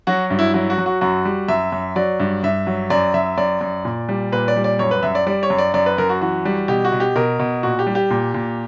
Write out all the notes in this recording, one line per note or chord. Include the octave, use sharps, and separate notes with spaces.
F#3 F#4
G2
E4
F#3 E4
F#4
F#3
F#4
F#2 F#4
G3
F#2 E5
F#2
F#3 D5
G2
G2 E5
F#3
F#2 D5
F#2 E5
F#2 D5
F#2
A#2
G3
A#2 B4
D5
G3
D5
F#2 C#5
B4
F#2 E5
D5
G3 D5
C#5
F#2
D5
F#2 D5
B4
F#2 A#4
F#4
E3 F#4
G3
B2 G4
F#4
B2
G4
B2 A#4
B2
A#2 F#4
G4
G3
G4
A#2
A#2